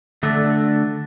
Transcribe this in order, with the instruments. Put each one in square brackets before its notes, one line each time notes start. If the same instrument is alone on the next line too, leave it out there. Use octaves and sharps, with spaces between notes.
[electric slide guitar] D3 A3 D4 F#4 A4